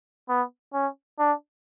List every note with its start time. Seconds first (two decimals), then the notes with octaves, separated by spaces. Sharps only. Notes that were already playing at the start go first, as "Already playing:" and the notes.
0.29 B3
0.74 C#4
1.19 D4